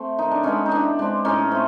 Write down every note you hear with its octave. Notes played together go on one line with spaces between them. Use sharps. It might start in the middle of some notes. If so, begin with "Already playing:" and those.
Already playing: A3 C4
D#3 D#4
D4
G#3 B3 C#4 D#4
D#4
E3 D4
G#3 C4 D4
A2 C#4 D#4
A3 C4